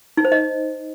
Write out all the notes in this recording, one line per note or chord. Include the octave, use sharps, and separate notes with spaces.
D#4
C5
D#5